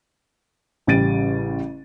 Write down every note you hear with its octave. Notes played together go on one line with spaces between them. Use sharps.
A1 C#3 G3 A6 D7 D#7